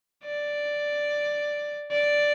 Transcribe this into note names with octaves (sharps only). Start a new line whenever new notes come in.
D5
D5